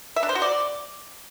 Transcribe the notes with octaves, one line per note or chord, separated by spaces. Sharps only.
E5
D4
C5
F#4
D5